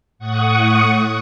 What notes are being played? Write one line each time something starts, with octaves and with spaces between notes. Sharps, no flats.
A2 F#5 C#6 D#6